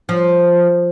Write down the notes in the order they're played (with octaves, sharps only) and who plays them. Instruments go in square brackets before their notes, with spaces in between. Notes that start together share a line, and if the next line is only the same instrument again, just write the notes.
[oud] F3